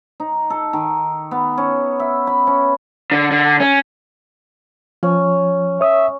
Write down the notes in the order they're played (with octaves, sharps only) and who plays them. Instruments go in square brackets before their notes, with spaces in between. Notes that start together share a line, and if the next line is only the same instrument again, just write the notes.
[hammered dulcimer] D#4
A4
D#3
B3
C#4
E5
B5
C#4
[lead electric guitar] D3
D3
C#4
[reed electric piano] F3 [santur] C#4
[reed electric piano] C#5 D#6 [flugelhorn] E5